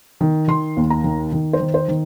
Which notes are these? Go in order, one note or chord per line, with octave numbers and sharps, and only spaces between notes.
D#3
D#3 C6
D#2
A#5
D#3
D#3
C5
D#3
C5
D#3